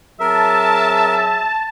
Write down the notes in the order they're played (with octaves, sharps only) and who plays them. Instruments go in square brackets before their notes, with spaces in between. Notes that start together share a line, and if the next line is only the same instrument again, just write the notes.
[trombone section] F#3 C4 G#4 [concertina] A#4 [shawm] E5 [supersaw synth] A5